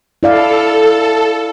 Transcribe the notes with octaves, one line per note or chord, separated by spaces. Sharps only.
E4 A4 D5 F5